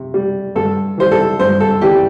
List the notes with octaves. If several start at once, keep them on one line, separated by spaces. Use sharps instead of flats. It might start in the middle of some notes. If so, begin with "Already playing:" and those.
Already playing: C3
G3
G2 A4
E3 G3 C5
A4
G2 C5
A4
E3 G3 G4